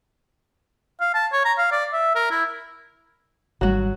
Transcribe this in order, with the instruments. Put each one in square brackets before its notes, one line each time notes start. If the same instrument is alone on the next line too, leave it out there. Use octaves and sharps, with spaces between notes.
[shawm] F5
A5
C#5
A#5
F5
D5
E5
A#4
E4
[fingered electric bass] G#1 G3 [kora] F#3 F#4